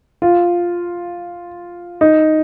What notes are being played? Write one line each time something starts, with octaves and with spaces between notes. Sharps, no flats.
F4
D#4